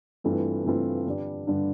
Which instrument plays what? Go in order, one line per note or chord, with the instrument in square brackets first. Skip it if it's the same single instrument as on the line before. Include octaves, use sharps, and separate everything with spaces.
[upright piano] G2 E3 A3 C4 F4
G2 E3 A3 C4 F4
G2 D3 G3 D4
G2 D3 G3 D4